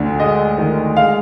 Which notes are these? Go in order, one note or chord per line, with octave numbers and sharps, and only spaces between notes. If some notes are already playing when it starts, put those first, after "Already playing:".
Already playing: D2 D3
G#3 D#5
D#3
G#3 F5